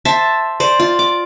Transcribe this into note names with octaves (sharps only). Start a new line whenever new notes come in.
C5 E5 A5
C5 D5
F4
D6